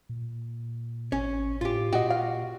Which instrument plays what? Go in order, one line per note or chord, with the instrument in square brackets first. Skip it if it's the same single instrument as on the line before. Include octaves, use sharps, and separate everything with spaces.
[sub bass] A#2
[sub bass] G#1 [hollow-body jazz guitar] C#4
[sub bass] A2 [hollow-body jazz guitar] F4 G4
[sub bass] A#2 [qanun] F#4 [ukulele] D#5 G5
[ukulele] F5